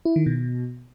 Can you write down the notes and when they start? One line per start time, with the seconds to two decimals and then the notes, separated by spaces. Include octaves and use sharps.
0.05 E4
0.16 D#3
0.26 B2